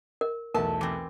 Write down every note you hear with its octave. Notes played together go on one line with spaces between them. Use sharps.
A#4
B1 E2 A3 A#4 A5
E3 C4